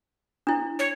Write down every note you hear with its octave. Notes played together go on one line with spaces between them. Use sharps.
D4 E4
C#5